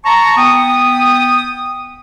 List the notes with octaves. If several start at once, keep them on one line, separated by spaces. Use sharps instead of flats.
A5 A#5 C#6
B3 G5 D#6